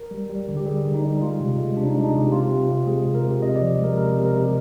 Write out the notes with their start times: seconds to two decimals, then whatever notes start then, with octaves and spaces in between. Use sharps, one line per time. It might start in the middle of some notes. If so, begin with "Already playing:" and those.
Already playing: A#4
0.11 G3
0.30 G3
0.48 D3
0.57 G4
0.66 G3 G#4
0.85 D3
0.94 D#4
1.03 G3
1.17 D#4
1.21 G#3 F4
1.40 C3
1.58 G#3
1.77 C3 D4
1.85 D#4
1.95 G#3 D4
2.04 D#4
2.14 C3
2.24 G4
2.32 C3 F4
2.51 C3
2.69 C3
2.87 G#3 G#4
3.06 C3
3.15 A#4
3.24 C3
3.42 C3 D#5
3.56 D5
3.61 F3
3.79 G#3
3.84 A#4
3.97 C3 A#4
4.16 C3
4.25 A#4
4.34 C3
4.43 G4